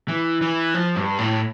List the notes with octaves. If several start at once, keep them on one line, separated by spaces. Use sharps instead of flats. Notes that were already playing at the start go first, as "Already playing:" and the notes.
E3
E3
F3
G2
A2